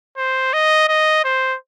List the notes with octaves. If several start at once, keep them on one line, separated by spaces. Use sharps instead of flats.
C5
D#5
D#5
C5